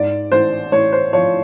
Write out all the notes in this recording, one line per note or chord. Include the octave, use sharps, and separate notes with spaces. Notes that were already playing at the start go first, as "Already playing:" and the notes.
Already playing: G#2 D5
A1 C5
A1 C#5
C5
F3 C#5